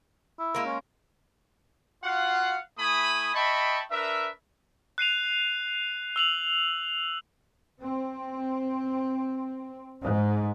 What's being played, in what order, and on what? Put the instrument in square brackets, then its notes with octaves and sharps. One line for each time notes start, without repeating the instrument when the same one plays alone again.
[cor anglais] E4
[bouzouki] G#3 A#3 A#4
[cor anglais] C#4
[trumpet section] F4 F#4 F5 F#5
A3 E4 G#5 B5 D#6
D#5 E5 G5 A5 B5 C#6
D4 A#4 B4 E5
[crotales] F#6 C7 D#7 F7
E6 F7 F#7
[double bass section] C4
G#2